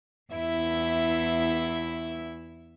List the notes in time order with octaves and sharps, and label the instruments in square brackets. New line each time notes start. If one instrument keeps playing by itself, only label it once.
[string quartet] E2 E4 E5